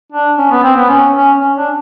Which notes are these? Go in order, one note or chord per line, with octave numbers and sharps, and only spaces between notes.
D4
C#4
B3
C4
B3
C#4
C#4
C#4
D4